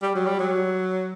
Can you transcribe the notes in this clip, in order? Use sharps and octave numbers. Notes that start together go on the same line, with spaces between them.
G3
F#3
G3
F#3